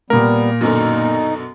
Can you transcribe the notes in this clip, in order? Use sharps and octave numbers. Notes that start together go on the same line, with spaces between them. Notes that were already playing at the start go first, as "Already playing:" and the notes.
A#2 G3 A#3 B3 A#4
F#2 B2 D3 D#4